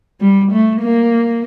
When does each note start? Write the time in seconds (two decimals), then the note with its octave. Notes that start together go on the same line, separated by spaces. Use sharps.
0.20 G3
0.51 A3
0.82 A#3